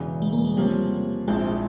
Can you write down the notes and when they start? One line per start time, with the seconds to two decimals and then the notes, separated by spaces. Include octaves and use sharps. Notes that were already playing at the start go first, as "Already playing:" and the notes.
Already playing: E1 E2 C#3 E3
0.22 G#3
0.33 A#3
0.45 G#3
0.57 C3 F3 G3 A#3 C#4
1.28 A#1 G#2 F3 G#3 C4 E4